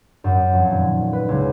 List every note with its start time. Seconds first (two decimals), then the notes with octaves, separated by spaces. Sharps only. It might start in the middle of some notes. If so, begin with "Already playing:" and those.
0.24 F#2
0.53 F2
0.70 D#1
1.13 B4
1.29 C#2